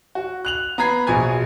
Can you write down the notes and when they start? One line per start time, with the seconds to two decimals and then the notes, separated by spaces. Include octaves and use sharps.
0.15 F#4
0.45 F#6 F7 F#7
0.78 B3 A#5 B5 G#6 C7
1.07 A#1 B2 F3 G#5 G#6